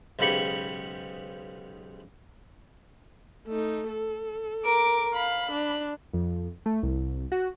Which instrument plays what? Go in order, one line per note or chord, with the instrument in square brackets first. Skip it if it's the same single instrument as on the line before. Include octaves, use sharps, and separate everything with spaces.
[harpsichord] B1 G#2 C#3 G4 B5 C#6
[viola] A3 D#4
A4
[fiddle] A#4 D6
[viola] F5 [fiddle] B5
[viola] D4
[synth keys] F2
A3
C2
F#4